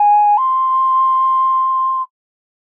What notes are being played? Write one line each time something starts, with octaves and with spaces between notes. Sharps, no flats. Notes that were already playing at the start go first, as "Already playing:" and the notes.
Already playing: G#5
C6